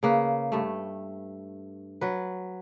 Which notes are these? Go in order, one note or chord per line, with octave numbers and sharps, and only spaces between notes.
C#3 A#3 B4
G2 A3
F#3 B4